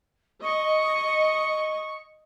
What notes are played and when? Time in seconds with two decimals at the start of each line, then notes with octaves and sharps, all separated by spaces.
0.43 D#5 C#6